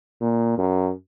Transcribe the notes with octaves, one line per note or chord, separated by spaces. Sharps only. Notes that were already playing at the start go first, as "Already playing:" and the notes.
A#2
F#2